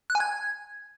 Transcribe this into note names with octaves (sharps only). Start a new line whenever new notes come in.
F#6
G#5
G#6